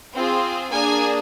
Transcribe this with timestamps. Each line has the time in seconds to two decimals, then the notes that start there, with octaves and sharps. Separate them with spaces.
0.14 C4 F4 G#4
0.72 A#3 D4 G#4 G#5